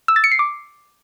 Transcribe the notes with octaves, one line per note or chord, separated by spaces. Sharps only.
E6
A6
C#7
C7
D6